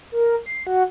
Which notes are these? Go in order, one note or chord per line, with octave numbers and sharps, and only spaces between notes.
A#4
C7
F#4